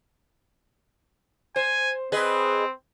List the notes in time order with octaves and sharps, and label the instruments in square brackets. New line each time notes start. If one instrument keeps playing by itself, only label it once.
[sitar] C5 [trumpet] G#5
[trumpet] C4 [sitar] G#4 B4 D#5